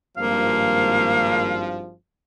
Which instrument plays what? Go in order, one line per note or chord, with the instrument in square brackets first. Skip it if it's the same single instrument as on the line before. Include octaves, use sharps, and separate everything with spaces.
[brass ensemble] G#1 G2 F3 [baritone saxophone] A#3 [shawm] F5